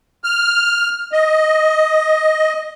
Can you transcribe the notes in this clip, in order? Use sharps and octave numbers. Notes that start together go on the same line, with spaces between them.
F6
D#5